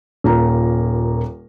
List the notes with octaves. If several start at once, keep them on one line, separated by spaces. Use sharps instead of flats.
D#1 A#3 F4 A#5